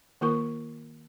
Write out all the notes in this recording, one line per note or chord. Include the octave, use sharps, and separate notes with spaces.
D#3 A#3 F4 A#4 C#6